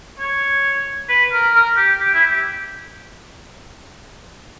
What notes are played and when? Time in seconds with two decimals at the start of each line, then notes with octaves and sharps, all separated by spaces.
0.19 C#5
1.09 B4
1.32 A#4
1.54 A#4
1.76 G4
2.00 G4
2.14 E4
2.30 G4